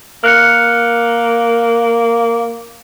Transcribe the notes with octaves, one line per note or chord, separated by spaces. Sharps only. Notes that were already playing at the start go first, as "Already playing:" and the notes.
A#3 F6 F#6 C#7